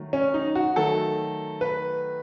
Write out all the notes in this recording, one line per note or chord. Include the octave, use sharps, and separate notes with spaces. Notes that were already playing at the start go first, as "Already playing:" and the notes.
Already playing: D#3 F#3 A3
C#4
D#4
F#4
D#3 F#3 A3 A4
B4